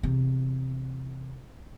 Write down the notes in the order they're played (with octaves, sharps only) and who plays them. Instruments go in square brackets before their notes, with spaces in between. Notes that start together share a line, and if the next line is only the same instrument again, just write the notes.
[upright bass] E2 C3